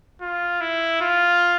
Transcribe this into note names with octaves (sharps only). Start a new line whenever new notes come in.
F4
E4
F4